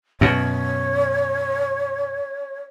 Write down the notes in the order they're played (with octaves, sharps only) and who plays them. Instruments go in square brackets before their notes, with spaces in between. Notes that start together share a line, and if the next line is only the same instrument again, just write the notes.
[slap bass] F#2 B2 [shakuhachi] C#5